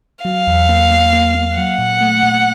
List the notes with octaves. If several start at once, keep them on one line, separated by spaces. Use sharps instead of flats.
F#3 F5
E2
A#3
A#3
A#3
A#3
F#3 F#5
A#2
A3
A#2